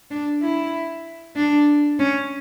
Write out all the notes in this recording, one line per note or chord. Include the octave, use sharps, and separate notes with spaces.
D4
E4
D4
C#4